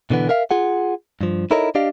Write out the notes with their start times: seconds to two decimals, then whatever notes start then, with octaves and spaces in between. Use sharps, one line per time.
0.10 B2 D3 E3 B3
0.29 A#4 E5 F5
0.51 F4 G#4 F#5
1.21 G2 F3
1.51 D#4 E4 A4 A#4 C#5 D#5
1.75 D4 G4 D5 D#5 F5